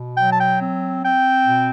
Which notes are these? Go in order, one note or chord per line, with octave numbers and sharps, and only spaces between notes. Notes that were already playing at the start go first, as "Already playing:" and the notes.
Already playing: B2
F#3 G5
A5
G5
C4
C4 G5
B2